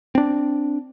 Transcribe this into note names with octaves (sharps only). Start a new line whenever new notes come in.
C4 D4